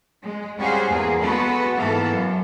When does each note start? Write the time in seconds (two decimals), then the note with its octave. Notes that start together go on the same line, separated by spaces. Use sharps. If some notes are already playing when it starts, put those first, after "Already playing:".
0.22 G#3
0.57 G3 C#4 F#4 G#4 C5 F5
0.90 E2 A#3 G#4
1.21 G#3 B3 F#4 A4 B4
1.77 G#2 E3 A#3 B3 A4
2.08 F#2